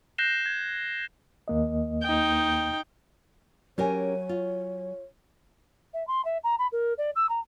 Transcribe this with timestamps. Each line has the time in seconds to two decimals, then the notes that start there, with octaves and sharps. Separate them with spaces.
0.18 F#6 G6 A#6 C7 E7 G7
0.46 G#6
1.48 D#2 A#3 D#5
2.03 D#4 G5
3.78 F#3 C#4 G4 A#4 C#5 G#5
4.29 F4
5.93 E5
6.07 C6
6.25 E5
6.44 A#5
6.59 B5
6.72 A#4
6.98 D5
7.15 E6
7.29 A#5